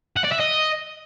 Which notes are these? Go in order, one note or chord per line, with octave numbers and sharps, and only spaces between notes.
F#5
D5
E5
D#5